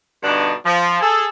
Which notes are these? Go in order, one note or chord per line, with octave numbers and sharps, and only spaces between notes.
G2 B2 D3 D4 D#4
F3
G#4 A4